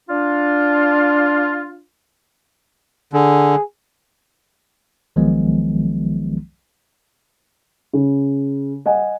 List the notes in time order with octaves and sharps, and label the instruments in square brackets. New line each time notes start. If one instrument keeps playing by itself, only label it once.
[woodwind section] D4 F4
[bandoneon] D3 [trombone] G#4
[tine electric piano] B1 D#3 F3 F#3 G#3 B3
[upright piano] C#3
D#5 F#5 G#5